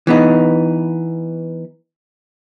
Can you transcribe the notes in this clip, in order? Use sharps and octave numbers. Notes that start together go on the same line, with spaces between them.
E3 B3 D#4